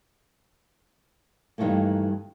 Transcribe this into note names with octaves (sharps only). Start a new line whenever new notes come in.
G2 D#3 E3 A3 A#3